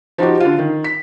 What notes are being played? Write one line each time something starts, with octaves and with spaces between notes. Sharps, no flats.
F3 D#4 F#4 G4
D3 F4
D#3
B6